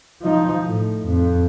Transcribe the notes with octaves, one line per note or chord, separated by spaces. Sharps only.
F3 D#4
A2
F2